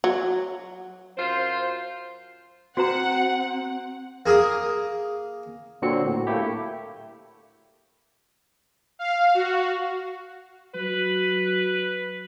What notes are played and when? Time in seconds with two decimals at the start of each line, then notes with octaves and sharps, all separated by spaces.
0.04 F#3
1.17 F#2 F4 C5
2.77 C4 F#4 C5 F#5 A#5
4.26 A#3 G#4 A#4 D#6
5.82 A#2 D3 F#3 C4 F#4 C#7
6.05 A2
6.27 A3 A#3 E4 G4
8.99 F5
9.35 F#4
10.75 F#3 B4